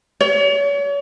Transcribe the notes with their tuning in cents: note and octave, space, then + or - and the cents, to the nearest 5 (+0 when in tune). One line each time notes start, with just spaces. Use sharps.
C#5 +40